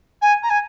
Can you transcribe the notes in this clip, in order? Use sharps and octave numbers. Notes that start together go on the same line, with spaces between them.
G#5
A#5
G#5